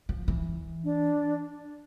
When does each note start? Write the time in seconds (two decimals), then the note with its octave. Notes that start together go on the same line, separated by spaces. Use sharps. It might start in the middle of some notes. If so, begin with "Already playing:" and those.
0.09 F3
0.28 E3
0.84 D4